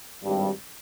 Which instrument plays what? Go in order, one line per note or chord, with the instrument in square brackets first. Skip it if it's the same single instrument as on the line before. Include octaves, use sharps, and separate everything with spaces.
[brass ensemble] G#1 G2 G3